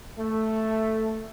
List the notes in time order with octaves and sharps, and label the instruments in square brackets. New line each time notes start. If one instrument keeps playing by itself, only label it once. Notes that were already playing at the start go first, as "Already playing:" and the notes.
[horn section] A3